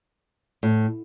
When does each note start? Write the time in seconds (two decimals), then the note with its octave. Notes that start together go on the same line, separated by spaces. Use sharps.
0.63 A2